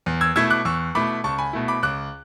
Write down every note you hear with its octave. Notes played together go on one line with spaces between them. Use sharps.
E2
E6 G#6
B2 A3 E4 E6 G#6
D6 F#6
E2 C#6 E6
B2 A3 E4 B5 D6
C#2 A5 C#6
G#5 B5
B2 A3 E4
B5 D6
C#2 D6 F#6